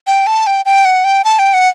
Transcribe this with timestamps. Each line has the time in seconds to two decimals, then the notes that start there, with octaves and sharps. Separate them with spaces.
0.07 G5
0.27 A5
0.47 G5
0.66 G5
0.85 F#5
1.04 G5
1.24 A5
1.39 G5
1.54 F#5